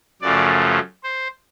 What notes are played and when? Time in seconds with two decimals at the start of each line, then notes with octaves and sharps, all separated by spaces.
0.22 F#2 C#3 F3 A3 D5
1.03 C5